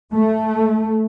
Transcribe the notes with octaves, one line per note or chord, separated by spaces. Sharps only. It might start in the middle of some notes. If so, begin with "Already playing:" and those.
A3